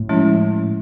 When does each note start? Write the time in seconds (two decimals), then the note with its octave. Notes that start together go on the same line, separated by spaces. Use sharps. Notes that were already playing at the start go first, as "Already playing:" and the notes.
Already playing: A2
0.09 F3 G#3 C#4 E4